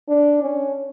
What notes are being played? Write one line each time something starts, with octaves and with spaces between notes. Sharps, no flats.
D4
C#4